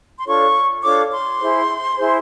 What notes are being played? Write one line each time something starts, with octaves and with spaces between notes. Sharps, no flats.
C6
D4 F4 A4 C#5 C#6
D4 F4 A4 C#5 D6
C6
E4 G#4 C5
E4 G#4 C5